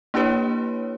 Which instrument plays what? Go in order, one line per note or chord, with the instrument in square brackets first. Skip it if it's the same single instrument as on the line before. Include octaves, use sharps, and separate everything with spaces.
[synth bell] A#3 D4 E4 G4 B4 C#5